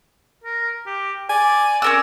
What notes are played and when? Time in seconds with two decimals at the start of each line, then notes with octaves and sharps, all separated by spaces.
0.44 A#4
0.86 G4
1.30 D5 G#5
1.82 C#4 A#4 D5 E6